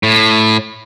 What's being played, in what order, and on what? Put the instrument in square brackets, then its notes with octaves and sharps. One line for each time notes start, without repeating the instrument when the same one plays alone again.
[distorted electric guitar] A2